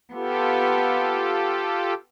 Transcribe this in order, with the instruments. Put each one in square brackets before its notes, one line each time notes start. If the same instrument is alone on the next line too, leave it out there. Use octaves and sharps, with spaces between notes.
[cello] B3 [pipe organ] F4 G4 A4